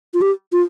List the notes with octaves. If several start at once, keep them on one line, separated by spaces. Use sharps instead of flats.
F4
G4
F4